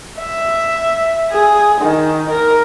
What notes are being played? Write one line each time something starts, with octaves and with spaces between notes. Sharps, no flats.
E5
G#4
D#3
A#4